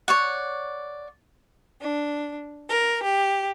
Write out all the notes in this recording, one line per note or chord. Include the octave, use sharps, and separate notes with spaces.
C#5 D5 F#5
D4
A#4
G4